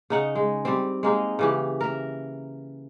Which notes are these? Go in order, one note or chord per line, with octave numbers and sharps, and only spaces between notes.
C#3 D#4 F#5
G#3
G3 C4
G#3 A#3 D#4
C#3 E3 G4
A#4 E5